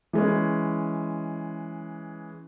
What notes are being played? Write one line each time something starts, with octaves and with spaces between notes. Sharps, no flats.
E3 G#3 C#4